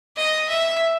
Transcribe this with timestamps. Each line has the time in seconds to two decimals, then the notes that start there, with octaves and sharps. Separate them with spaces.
0.17 D#5
0.49 E5